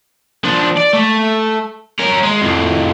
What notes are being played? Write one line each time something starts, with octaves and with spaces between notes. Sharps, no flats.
F3 D4
D5
A3
C#4 A#4
G#3
F2 A2